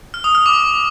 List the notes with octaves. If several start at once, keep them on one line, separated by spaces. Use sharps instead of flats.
F6
D#6
F6
D6